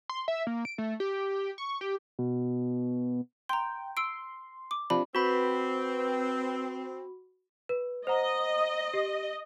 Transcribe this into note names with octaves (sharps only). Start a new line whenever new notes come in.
C6
E5
A#3
D7
A3
G4
C#6
G4
B2
G5 A#5 C6
C6 E6 D7
D6
C3 F3 D4 B5
C4 F#4 B4 B5
B4
C5 D#5 F#5 A#5
G4